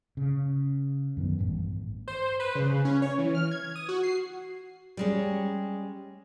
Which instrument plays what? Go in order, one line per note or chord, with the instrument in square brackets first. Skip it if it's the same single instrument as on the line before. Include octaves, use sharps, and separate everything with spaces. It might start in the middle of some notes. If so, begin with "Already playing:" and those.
[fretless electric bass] C#3
F#2 D#3 B3
A1 G2
[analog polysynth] C5
B4
C#3
C#4
C#5
E3
F6
G#6
D#6
F#4
C7
[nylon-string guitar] G3 G#3 C#4